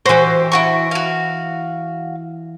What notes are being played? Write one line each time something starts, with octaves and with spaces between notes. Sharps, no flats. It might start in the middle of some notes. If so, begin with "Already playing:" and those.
E3 F#4 G4 C5
E4 F#4 C#6
F#4 F5